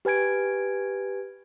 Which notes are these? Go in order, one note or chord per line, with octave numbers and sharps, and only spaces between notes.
G4 B4 G#5 G#6 D7